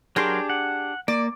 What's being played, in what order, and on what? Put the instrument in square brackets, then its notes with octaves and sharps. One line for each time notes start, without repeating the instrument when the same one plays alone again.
[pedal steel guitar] F#3 A#4 C6 [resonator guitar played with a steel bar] D4 G4 G#4
[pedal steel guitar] F#5
[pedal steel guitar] A#3 [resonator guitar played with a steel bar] D5